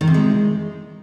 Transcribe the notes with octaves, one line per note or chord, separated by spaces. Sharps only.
D#3
C3
G#3